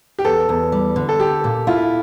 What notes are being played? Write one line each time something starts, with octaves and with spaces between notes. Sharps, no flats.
G4
E2 A4
E2
G3
D3
A4
G4 A4
A#2
E4 F4